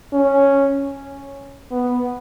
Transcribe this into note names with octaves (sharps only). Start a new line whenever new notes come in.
C#4
B3